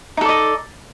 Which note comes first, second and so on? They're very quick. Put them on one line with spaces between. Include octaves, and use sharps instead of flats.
D#4 A4 D5 D#5